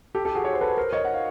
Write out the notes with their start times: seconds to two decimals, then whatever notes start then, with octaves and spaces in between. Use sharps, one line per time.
0.15 G4 A4
0.25 G4 A4
0.35 F#4 G#4
0.44 C#5
0.53 C5
0.61 A4 B4
0.77 A#4 C5
0.93 C#5 D#5
1.05 F#5
1.14 F5